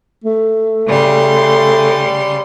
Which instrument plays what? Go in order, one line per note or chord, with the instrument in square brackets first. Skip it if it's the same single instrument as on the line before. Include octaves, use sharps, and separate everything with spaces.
[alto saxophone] A3
[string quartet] C#3 G3 C6